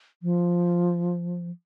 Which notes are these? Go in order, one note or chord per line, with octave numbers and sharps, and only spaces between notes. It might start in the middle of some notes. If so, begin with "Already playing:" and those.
F3